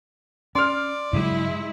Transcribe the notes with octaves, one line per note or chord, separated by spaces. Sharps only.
C#4 D5 C6 F6
G2 C#3 F#3 G#3 E4